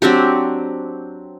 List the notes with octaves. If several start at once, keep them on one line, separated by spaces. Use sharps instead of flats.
F#3 C4 D4 G4